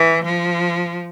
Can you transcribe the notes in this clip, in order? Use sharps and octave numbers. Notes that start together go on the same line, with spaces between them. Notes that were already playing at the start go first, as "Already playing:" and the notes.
Already playing: E3
F3